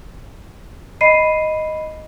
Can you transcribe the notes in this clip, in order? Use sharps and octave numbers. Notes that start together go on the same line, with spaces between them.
D#5 B5 C7 D#7